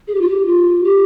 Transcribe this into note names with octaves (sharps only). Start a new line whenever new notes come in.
G#4
G4
F4
G4
F4
G4